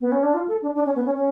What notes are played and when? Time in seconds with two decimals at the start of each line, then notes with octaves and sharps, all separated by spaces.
0.01 B3
0.12 C#4
0.23 D4
0.34 F4
0.48 A4
0.62 D4
0.75 D4
0.85 C#4
0.96 B3
1.05 C#4
1.16 C#4